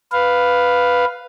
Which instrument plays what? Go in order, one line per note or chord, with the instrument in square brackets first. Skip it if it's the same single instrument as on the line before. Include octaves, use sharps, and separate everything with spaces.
[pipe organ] B4 F5